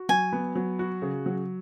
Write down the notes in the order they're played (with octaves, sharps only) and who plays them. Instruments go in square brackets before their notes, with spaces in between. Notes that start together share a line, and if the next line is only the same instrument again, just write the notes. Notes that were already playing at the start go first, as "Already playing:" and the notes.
Already playing: [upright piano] F#4
[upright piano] F#3 [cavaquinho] G#5
[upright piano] B3
F#3
F#4
C#3
F#3